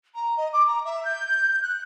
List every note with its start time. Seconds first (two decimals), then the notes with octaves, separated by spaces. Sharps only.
0.14 A#5
0.37 D#5
0.52 D6
0.67 A#5
0.85 E5
1.04 G6
1.62 F#6